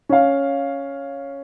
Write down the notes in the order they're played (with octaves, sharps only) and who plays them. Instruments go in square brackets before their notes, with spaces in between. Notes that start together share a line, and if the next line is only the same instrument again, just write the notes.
[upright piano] C#4 F5